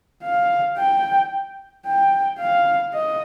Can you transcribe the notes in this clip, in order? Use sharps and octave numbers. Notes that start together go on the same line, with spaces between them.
F5
G5
G5
F5
D#5